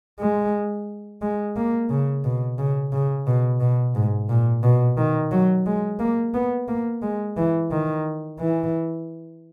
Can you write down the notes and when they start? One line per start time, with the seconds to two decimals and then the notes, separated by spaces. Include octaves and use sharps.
0.20 G#3
1.21 G#3
1.56 A#3
1.90 C#3
2.24 B2
2.58 C#3
2.92 C#3
3.27 B2
3.60 B2
3.95 G#2
4.29 A#2
4.63 B2
4.97 D#3
5.32 F#3
5.66 G#3
6.00 A#3
6.34 B3
6.68 A#3
7.02 G#3
7.37 E3
7.71 D#3
8.39 E3